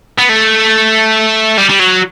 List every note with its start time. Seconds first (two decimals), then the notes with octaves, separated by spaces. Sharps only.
0.18 B3
0.29 A3
1.58 G3
1.70 G3
1.80 F#3